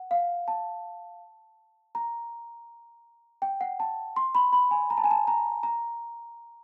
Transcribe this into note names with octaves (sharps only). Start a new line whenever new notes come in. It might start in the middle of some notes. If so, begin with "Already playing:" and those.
Already playing: F#5
F5
A5
A#5
G5
F#5
A5
C6
B5
B5
G#5
A#5
A5
G#5
A5
A#5
A#5